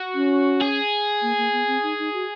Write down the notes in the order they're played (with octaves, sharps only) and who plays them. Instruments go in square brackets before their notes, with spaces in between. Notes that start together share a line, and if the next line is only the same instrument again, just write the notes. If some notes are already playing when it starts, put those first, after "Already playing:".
Already playing: [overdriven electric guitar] F#4
[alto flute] C#4
[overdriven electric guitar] G#4
[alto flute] A#3
A#3
B3
C4
D#4
D#4
F#4